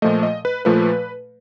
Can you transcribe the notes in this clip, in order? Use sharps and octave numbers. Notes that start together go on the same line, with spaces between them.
A#2 F3 A3 D#5
D#5
B4
A#2 F3 A3 B4